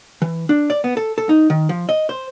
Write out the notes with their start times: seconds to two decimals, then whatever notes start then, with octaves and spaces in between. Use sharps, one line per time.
0.22 E3
0.49 D4
0.70 D5
0.84 B3
0.97 A4
1.18 A4
1.29 D#4
1.50 D#3
1.69 F3
1.89 D#5
2.09 C5